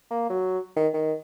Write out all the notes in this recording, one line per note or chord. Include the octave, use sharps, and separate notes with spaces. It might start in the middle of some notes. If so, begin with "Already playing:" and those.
A#3
F#3
D#3
D#3